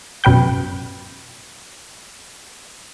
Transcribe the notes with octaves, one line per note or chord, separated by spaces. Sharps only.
F#2 B2 B4 G5 G6